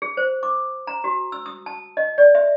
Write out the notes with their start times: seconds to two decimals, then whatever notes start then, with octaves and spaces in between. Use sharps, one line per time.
0.02 G#4
0.17 C5
0.43 D6
0.87 A#5
1.04 F#4
1.32 E6
1.46 D#6
1.66 A5
1.97 D#5
2.18 D5
2.35 E5